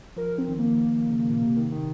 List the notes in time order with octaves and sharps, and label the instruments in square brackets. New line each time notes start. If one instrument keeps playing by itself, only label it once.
[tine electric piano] F3 [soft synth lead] A#4
[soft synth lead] C4
[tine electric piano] D#3
[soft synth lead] A#3
[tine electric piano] C#3
A#2
C3
D#3
D#3